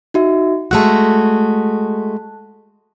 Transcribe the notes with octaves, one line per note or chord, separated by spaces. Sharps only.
D#4 F#4 E5
G#3 A3 F#4 A5 F#6